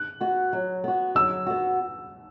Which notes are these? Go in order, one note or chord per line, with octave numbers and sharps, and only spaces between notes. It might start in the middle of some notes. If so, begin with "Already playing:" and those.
Already playing: F#6
B3 F#4
F#3
B3 F#4
F#3 E6
B3 F#4